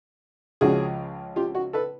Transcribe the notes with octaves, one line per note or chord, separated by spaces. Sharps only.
C#2 C#3 F3 F#4 G#4
F4 G4
F#4
A4 B4